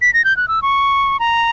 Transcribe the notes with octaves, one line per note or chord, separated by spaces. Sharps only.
B6
A#6
G6
F#6
E6
C#6
A#5